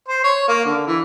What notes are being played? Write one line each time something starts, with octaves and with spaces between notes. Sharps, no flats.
C5
C#5
A#3
D3
E3